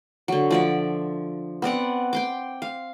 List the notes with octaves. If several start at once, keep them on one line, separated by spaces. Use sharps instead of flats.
D3 F#3
F3 D5 E5
B3 C4 D5 F#5
G5 C6 D6
F5